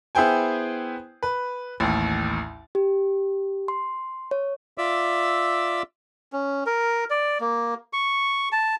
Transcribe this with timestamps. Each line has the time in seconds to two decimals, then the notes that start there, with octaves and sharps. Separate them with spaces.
0.15 B3 E4 G#4 C5 G5 G#5
1.23 B4
1.80 A1 D#2
2.75 G4
3.68 C6
4.31 C#5
4.78 F4 D5 E5 D6 E6
6.33 C#4
6.66 A#4
7.10 D5
7.40 A#3
7.93 C#6
8.52 A5